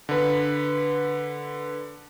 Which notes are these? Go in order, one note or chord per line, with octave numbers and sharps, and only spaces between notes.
D3 B4